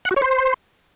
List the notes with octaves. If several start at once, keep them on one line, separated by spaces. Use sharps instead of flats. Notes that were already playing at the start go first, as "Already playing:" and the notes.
F#5
F#4
C#5
C5